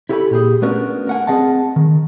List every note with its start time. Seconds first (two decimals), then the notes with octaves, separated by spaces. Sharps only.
0.09 E4 G4 A4 D5 G#5 B5
0.31 A#2 G4 G#4
0.62 A3 B3 C#4 D4 F#4 A#4
1.07 A#4 F#5 G#5
1.27 C4 G#4 D#5 F#5 A5
1.76 D#3